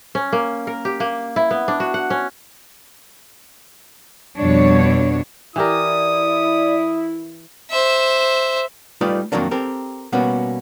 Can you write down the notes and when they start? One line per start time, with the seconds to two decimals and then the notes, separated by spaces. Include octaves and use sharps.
0.15 C#4
0.32 A#3
0.67 A#4
0.85 G4
1.00 A#3
1.36 E4
1.51 B3
1.68 D4
1.80 F#4
1.94 F#5
2.10 C#4
4.37 F2 B2 G3 D4 C#5
5.56 E3 E4 G4 A#4 D5 D#6
7.70 C5 E5
9.01 G3 A3 D#4 F4 B4 D5
9.32 F2 G#2 D#3 F#3 A#3 D4
9.51 C4 G4 A4 A#4
10.12 B2 G3 A#3 B3 C#4 F#4